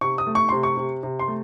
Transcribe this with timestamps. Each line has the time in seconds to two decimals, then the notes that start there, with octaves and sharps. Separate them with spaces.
0.01 C3 C#6
0.18 D#6
0.27 A3
0.35 C#6
0.49 C3 C6
0.63 C#6
0.77 C3
1.03 C3
1.19 C6
1.28 A3